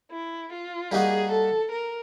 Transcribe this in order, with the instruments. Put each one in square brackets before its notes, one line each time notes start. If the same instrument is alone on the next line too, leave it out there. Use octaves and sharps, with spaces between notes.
[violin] E4
F4
[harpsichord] G3 A#3 D#4 F#4 [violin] G#4
[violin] A4
A#4